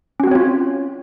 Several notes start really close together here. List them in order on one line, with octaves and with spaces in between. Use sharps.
C#4 F#4 C4 C#5 F4